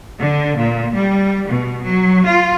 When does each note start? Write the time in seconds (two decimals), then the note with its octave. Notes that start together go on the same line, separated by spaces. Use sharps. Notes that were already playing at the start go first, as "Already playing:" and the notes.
0.19 D3
0.58 A#2
0.94 G3
1.48 B2
1.84 F#3
2.25 F4